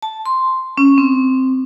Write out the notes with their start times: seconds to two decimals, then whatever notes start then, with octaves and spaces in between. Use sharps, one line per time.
0.02 A5
0.26 C6
0.77 C#4
0.98 C4